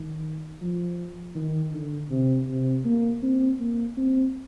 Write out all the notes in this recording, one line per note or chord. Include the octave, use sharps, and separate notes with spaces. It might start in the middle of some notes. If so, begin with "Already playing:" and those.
Already playing: D#3
F3
D#3
D3
C3
C3
A#3
C4
A#3
C4